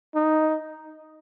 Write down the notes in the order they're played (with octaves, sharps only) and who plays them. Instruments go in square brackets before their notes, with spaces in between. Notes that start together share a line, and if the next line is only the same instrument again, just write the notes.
[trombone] D#4